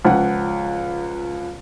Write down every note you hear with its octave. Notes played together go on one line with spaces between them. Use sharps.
C#2 F3 F#5